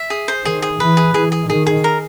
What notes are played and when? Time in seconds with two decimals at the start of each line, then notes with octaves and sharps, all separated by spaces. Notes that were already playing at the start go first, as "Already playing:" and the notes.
Already playing: E5
0.10 G#4
0.28 C5
0.45 D#3 G#4
0.62 G#4
0.80 E3 B4
0.97 G#4
1.14 E3 G#4
1.32 G#4
1.49 D#3 G#4
1.67 G#4
1.84 A#4